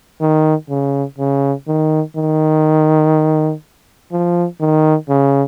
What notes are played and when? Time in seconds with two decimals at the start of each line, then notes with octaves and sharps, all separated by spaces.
0.21 D#3
0.69 C#3
1.18 C#3
1.67 D#3
2.16 D#3
4.12 F3
4.61 D#3
5.09 C#3